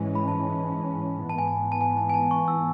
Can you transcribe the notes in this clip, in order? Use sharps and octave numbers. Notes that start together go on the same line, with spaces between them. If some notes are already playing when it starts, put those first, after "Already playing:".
Already playing: G#2 E3 G#3 C#4
B5
A5
G#2 E3 B3 A5
G#5
A5
A5
G#5
A5
G#5
A5
C#6
E6